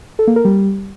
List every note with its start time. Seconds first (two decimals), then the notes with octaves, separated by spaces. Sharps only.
0.19 A4
0.27 A#3
0.36 A#4
0.45 G3